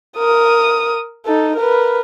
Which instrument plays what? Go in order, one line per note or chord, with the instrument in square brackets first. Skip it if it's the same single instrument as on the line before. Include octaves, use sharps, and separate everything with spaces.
[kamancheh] A#4 D#6
D#4 A4
A#4 B4